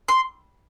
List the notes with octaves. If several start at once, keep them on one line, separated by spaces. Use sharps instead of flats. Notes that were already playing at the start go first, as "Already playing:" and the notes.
C6